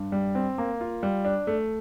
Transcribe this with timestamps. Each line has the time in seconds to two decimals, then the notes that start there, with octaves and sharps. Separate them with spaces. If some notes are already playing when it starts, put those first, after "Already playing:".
Already playing: G2
0.12 G3
0.35 C4
0.58 A#3
0.81 F4
1.03 G3
1.25 D4
1.47 A3